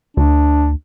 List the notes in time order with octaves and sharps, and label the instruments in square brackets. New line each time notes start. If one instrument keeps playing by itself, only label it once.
[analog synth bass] D2 [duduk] D4